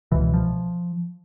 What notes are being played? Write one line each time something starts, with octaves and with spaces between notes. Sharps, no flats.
C#2 B2 E3
F3